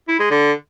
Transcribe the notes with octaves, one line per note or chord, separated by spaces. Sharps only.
E4
G#3
D3